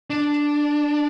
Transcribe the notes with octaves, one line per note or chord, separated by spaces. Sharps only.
D4